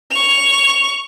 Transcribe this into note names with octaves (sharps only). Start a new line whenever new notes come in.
C#6 F7